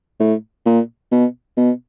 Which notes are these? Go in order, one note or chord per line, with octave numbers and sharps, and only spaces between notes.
A2
A#2
B2
B2